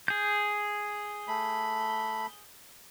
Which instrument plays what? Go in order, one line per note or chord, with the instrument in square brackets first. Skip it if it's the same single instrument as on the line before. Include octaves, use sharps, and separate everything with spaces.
[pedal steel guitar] G#4 G6
[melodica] A3 B5